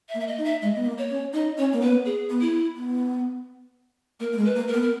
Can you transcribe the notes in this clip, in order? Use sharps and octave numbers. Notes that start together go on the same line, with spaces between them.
E5
A#3
E5
D#5
D#4
E5
G#3 D#5
B3
A#3
C#5
C#4
D#4 D#5
C#4 C#5
A#3
B3 B4
G#4
B3
E4
B3
A#3 A#4
A#3
G#3
B4
A#3
A#4
B3
A#4